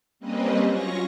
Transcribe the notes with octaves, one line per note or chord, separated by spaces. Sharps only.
G3 A#3 C4 C#4 B4 D#5
F#3 C#4 F4 C#6 A#6